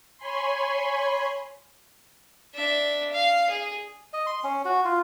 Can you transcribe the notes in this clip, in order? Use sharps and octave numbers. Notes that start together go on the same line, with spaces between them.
C#5 G#5 B5 C6
D4 E5
F5
G#4
D#5
C6
C#4
F#4
F4